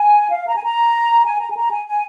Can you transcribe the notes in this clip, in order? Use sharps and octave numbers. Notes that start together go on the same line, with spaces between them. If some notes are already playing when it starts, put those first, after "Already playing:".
Already playing: G#5
F5
A#5
G#5
A#5
G#5
A#5
G#5
A#5
G#5
G#5